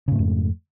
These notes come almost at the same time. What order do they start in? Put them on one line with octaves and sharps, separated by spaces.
C#3 G#2 A3 F2